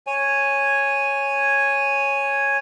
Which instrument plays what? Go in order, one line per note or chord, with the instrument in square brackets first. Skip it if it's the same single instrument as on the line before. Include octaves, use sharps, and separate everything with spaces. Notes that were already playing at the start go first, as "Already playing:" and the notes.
[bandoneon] C#5 G#5